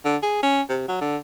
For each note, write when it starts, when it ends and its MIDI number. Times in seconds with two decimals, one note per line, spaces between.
0.05 0.17 50
0.23 0.41 68
0.43 0.61 61
0.69 0.85 48
0.88 1.00 54
1.01 1.17 50